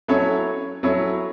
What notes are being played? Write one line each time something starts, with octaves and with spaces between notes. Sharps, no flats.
F#3 C#4 E4 A4 C#5
F#3 C#4 E4 A4 C#5